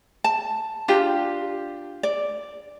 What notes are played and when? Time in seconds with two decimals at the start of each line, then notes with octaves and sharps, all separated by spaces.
0.24 A5
0.88 D4 F4 G4
2.03 D5